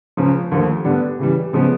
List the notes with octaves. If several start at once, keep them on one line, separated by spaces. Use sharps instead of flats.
C#2 C#3 F3
D#2 D3 F3 A3
D3 G3 B3 D4
C#3 E3 G3
C#3 F3 G#3 B3